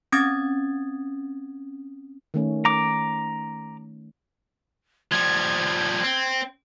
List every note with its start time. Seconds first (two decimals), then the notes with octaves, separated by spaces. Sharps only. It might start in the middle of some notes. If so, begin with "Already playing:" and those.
0.12 C4 C#4 D#6 G#6 A6
2.34 D#3 A3 C#4
2.65 A#5 D6
5.12 F3 G3 G#6
6.04 C4